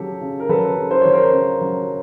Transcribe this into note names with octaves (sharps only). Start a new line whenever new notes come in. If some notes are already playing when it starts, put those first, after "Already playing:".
Already playing: C#3 F#3 G4 A4
C#3
A#4
F#3 A4 B4
C#3
C5
F#3 C#5
A#4 C5
C#3
F#3